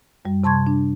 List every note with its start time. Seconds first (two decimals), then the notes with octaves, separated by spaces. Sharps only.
0.25 F#2 G3
0.44 C3 A5 C6 C#6 G#6
0.67 D4